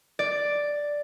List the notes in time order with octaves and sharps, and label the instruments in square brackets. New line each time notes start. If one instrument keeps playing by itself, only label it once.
[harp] D5